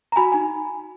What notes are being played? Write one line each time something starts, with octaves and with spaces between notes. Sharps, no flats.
A#5
F#4 G#5 B5
D#4 G#5